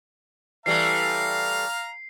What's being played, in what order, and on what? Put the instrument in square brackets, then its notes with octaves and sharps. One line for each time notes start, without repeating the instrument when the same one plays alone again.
[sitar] E3 G3 A3 [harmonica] F5 A#5 [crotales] C7